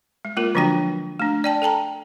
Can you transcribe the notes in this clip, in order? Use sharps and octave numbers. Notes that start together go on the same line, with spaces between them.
G#3
G#3 A#3 F4 A#4
D3 F3 F#3 D4 F#4 G5
A3 D4
D5 G5 A5
A4 G5 A5 A#5